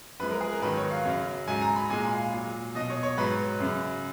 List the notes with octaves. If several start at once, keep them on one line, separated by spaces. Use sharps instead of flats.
F#2 F3 G#3 B4
A#4
G#4
A#4
G#2 D#3 F#3 B4
C#5
F5
F#2 C#3 F#3
G#2 F#3 G#5
A#5
B5
A#2 G#3 G#5
F5
A#2 F#3
B2 F#3 D#5
C#5
C#5
G#2 F#3 B4
F#2 C#3 F#3